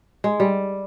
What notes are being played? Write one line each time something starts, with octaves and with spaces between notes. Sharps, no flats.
G#3
G3